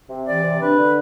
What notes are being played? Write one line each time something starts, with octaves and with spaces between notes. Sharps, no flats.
C3
E3 D5
C3
D4 B4
D3